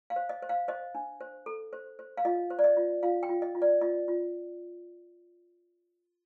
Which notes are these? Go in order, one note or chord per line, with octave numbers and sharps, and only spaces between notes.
F5
C5
D#5
C5
F5
C5 D#5
D4
C5
A4
C5
C5
F5
F4 D#5
C5
D5
D#5
F4
F4 F5
G5
F4
D#5
F4
D5
F4 D#5
F4